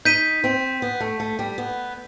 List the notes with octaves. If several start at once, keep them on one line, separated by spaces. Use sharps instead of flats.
D#4 G6 B6 D#7
C4
B3
A3
A3
G3
B3